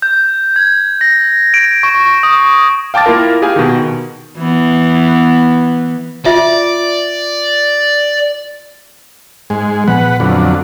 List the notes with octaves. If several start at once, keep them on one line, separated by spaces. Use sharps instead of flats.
G6
G#6
A#6
D7
C#6
D#6
F5 G5 A5 D6 A6
A#3 E4 F4 A#4
G4 G#4 F5 G#5
B2 D#3
E3 B3
F4 D5 E5
G#2 G#3
A#2 F3 B3 B4 F#5
F2 D3 F#3